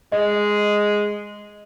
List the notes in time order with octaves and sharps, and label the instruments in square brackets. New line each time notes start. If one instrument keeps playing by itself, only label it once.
[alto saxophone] G#3 [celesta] D#5